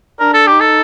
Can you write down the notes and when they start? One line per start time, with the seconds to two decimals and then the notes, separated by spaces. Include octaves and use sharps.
0.20 D4 A#4
0.34 A4
0.47 D#4 G4
0.60 A4